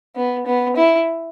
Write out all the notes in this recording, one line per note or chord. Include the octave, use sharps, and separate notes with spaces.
B3
B3
E4